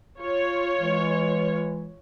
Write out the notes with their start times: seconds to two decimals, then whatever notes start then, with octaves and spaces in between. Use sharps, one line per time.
0.21 F4 C#5
0.80 E3 G#3